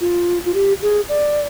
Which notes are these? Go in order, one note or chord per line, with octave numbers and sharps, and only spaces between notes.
F4
F4
G4
G#4
D5